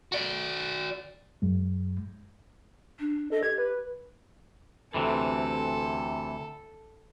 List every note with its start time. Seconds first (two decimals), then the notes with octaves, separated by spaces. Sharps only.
0.12 F#4 D5
1.42 F#2 G#3
3.00 D4
3.31 A4 D#5
3.43 G4 G#6
3.58 B4
4.94 D2 C3 E3 A4